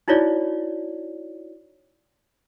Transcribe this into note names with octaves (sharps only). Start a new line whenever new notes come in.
D#4 E4 F#4 C#5 D5